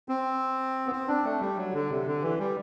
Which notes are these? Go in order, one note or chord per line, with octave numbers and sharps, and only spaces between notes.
C4
B3
C4
D4
A3
G3
F#3
D3
C3
D3
E3
G3